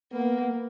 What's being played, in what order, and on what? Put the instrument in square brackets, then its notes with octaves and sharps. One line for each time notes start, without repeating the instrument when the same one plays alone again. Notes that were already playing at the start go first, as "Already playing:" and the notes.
[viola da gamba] A#3 [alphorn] B3